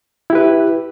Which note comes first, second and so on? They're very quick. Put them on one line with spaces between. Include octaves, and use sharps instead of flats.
E4 G4 B4 E5